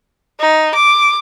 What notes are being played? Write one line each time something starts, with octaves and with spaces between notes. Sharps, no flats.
D#4
D6